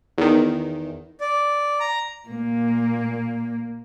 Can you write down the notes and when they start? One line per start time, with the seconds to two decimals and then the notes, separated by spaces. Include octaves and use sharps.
0.18 E2 D#3
1.21 D5
1.80 A#5
2.28 A#2 A#3